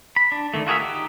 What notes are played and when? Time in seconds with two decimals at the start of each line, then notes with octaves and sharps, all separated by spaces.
0.16 B5
0.32 D4
0.54 D3 D#3 A3
0.67 F4 F#4 G#4 A#4 E5
0.80 D#4 G4